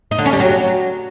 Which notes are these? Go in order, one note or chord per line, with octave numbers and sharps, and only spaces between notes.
D#4
D3
C#4
G3
F#3